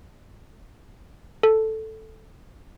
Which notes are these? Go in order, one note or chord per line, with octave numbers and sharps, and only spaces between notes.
A4